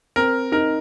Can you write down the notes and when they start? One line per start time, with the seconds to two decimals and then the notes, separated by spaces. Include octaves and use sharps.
0.16 C4 A#4
0.52 D#4 A#4